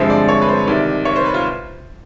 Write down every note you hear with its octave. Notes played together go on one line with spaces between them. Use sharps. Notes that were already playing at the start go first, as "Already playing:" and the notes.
Already playing: G2 D3 F3 G#3 C4 E5
D5
C#5
B4
C5
C2 C3 D#3 D5
C#5
C5
B4
F4